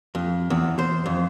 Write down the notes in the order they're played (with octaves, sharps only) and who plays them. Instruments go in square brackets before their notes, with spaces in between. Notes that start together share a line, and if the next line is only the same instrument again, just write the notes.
[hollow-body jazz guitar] F2
E2
C5
F2